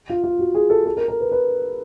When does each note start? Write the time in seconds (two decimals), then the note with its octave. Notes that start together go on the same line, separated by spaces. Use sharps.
0.10 F4
0.24 F4
0.39 F#4
0.55 G#4
0.70 A4
0.86 A4
0.97 A#4
1.08 A#4
1.20 B4
1.32 B4